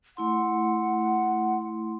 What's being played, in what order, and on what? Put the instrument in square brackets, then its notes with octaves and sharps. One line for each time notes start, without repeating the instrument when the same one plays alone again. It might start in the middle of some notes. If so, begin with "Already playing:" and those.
[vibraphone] A3 E4 C6 [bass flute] F#5